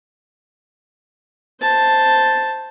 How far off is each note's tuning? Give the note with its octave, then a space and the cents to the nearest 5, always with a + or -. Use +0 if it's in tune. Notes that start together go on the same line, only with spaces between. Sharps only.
C5 +0 A5 +0